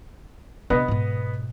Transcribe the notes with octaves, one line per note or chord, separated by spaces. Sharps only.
C3 B3 D4 B4 D#5
G#2 B2